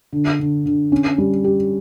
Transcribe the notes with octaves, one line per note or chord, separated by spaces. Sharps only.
D3
D3
D3
C#4
G3
G4